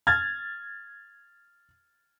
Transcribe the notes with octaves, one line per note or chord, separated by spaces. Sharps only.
F6 G#6 A6